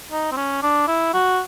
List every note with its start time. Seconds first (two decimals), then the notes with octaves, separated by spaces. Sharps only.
0.12 D#4
0.32 C4
0.37 C#4
0.63 D4
0.88 E4
1.14 F#4